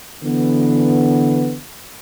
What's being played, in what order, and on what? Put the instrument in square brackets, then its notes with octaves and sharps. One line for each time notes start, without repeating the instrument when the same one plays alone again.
[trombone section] D3 E3 B3